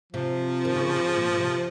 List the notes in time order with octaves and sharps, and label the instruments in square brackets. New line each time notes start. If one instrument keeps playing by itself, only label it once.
[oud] C3 [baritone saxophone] F3
[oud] D#3
C#3
C#3
A#2
A#2
C3